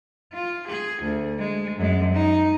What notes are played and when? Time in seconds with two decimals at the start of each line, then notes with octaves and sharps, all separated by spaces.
0.33 F4
0.67 G#4
1.03 D2
1.38 G#3
1.77 F#2 G#3
2.14 D#4